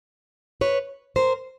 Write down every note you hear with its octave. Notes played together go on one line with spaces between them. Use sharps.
B4 C#5
A#4 C5